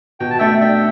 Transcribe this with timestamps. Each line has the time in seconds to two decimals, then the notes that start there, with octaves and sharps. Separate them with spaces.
0.20 B2 G5
0.30 A5
0.39 A3 E5 G5
0.60 D4 E5 G5